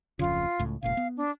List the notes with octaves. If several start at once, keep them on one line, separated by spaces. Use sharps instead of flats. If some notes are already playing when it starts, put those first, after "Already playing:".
D1 F2 C#3 F4
C#2 A2
E1 A#2 C#3 F5
B3
D4